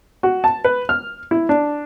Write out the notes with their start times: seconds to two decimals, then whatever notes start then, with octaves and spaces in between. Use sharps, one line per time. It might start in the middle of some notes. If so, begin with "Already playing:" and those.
0.23 F#4
0.44 A5
0.64 B4
0.89 F6
1.31 E4
1.49 D4